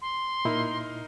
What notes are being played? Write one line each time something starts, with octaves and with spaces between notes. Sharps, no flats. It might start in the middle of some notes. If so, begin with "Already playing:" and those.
C6
A#2 D#4 E4 A#4